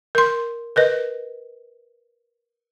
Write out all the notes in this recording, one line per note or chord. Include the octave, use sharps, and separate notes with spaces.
A#4 C6
A#4 B4 D#5